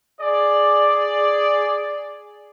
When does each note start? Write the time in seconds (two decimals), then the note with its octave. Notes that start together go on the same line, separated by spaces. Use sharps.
0.20 G#4 D5